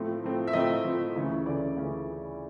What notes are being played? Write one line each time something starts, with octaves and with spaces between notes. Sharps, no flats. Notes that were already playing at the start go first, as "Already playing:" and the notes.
Already playing: A2 F3 A3 C4
A2 F3 A3 C4
E5
A2 F3 A3 C4 D#5
A2 F3 A3 C4
D2 C#3 E3 A3 C#4
D2 C#3 E3 A3 C#4 D5
D2 C#3 E3 A3 C#4